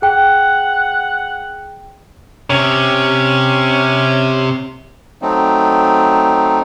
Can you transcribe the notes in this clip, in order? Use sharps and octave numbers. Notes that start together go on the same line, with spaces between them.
G#4 F#5 G5
C3 C#4
F#3 A3 C4 D#4